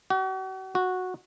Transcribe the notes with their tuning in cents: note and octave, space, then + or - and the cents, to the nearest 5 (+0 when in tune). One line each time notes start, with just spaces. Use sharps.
F#4 +40
F#4 -10